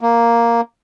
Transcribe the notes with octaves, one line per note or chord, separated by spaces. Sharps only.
A#3